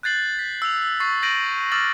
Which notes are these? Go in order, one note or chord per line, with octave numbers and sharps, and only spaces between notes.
F#6 G6 A6 C7 F#7
B6
E6 F7
C#6 A6 C7
G6 A#6 D7 D#7 F#7
D6 E6 F6 A6 F#7